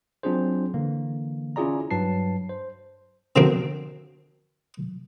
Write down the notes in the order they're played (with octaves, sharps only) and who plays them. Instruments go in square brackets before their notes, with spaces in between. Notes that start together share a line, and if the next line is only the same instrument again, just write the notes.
[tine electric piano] F#3 C4 D4 F4 G#4 C5
D3 E3 A#3
C#4 E4 F4 G#4 D5 A#5
G2 F#3 B4 A5 C7
C5
[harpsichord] B2 D3 F3 C4 F#4 A#4